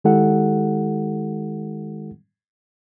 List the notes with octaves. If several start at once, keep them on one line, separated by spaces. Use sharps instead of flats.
D#3 G#3 E4 G4 A4 F#5